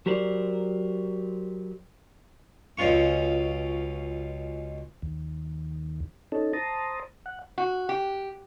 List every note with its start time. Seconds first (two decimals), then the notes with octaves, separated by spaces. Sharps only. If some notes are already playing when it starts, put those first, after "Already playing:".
0.06 F#3 G4 A#4 C5 D5
2.78 C#2 B2 C#4 F4 C#6
5.02 D#2
6.32 C#4 D#4 A4
6.53 C5 A5 A#5 D#6
7.26 F#5
7.58 F#4
7.89 G4